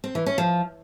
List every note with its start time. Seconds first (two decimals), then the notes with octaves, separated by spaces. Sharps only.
0.04 C4
0.15 E3
0.26 C#4
0.38 F3